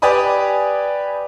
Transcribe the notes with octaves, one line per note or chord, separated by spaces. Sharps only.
G4 B4 D5 G#5 B5 D#6